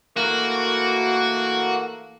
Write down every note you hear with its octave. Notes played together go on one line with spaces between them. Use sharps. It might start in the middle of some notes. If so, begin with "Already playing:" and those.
E3 A3 A#3 F#4